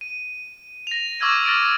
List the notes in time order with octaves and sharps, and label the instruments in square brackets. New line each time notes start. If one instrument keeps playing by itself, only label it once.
[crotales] D#7
A#6 F7
C#6 D6 E6 F6 G#6 D#7
F6 A6 A#6 D7 D#7